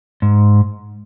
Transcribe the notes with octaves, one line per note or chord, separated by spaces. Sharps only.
G#2